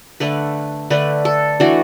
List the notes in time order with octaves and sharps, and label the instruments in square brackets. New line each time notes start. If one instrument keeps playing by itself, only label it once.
[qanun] D3 A3 D4 B4
D3 A3 D4 B4
A4
E3 A3 D4 F#4